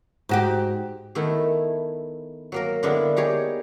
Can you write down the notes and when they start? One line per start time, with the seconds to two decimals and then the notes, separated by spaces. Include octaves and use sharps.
0.29 G#2 F#4 G4
1.15 D#3 A3 B3 E4
2.52 F#3 A#3 A#4
2.83 D3 G#3 A#3 B3 D4 E4
3.16 D#4 G4 G#4 C#5